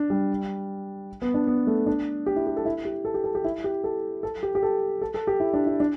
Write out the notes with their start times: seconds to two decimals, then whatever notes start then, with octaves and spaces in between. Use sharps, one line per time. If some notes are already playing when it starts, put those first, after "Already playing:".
Already playing: D4
0.10 G3
1.22 B3
1.34 D4
1.47 B3
1.67 A3
1.87 D4
2.26 G4
2.36 E4
2.47 G4
2.56 A4
2.65 E4
2.85 G4
3.05 A4
3.14 G4
3.24 A4
3.35 G4
3.44 E4
3.64 G4
3.84 A4
4.23 A4
4.43 G4
4.55 G4
4.63 A4
5.01 A4
5.14 A4
5.27 G4
5.40 E4
5.54 D4
5.67 E4
5.80 D4